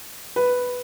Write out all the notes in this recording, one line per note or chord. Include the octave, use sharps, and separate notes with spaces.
B4